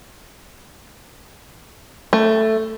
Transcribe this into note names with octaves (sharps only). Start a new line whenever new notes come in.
A3